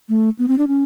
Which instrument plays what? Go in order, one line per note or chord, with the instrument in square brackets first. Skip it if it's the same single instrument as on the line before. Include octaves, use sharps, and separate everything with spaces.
[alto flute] A3
B3
C4
D4
C#4